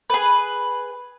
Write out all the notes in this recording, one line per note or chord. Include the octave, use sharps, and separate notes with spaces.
G#4 B4